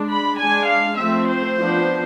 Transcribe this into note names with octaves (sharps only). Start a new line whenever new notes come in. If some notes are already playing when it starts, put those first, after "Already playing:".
Already playing: G#3 D4
B5
G#3 D4 G#5
F5
F3 A3 C4 E5
C5
F3 B3 D4